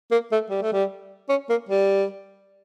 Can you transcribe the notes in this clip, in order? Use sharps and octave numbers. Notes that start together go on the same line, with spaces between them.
A#3
A3
G3
A3
G3
C#4
A#3
G3